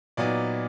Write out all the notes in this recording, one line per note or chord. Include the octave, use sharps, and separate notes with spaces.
A#2 F#3 B3 D#4 D5